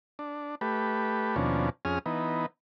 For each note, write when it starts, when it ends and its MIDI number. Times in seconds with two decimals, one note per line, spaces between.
0.19 0.55 62
0.61 1.36 57
0.61 1.36 67
0.61 1.36 71
1.36 1.70 39
1.36 1.70 47
1.36 1.70 53
1.36 1.70 61
1.36 1.70 62
1.85 1.99 41
1.85 1.99 61
1.85 1.99 68
1.85 1.99 87
1.85 1.99 89
2.06 2.46 52
2.06 2.46 59
2.06 2.46 63